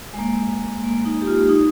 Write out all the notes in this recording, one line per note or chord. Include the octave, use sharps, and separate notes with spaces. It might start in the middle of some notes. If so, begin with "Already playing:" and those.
G#3
A#3
A#3
D#4
G4
F4
D#4